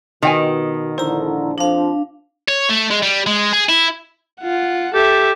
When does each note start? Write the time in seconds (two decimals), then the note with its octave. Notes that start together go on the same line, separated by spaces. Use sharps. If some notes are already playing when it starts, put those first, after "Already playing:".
0.23 B2 D#3 F4 G5 G#5
0.98 A#1 D3 E4 C5 A#5
1.58 F2 F3 D4 F5
2.49 C#5
2.69 A3
2.91 G#3
3.03 G3
3.27 G#3
3.53 G#4
3.69 E4
4.42 F4 F#5
4.94 G4 A4 E5